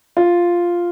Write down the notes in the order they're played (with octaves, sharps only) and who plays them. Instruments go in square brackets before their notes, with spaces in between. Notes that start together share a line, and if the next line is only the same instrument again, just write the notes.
[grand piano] F4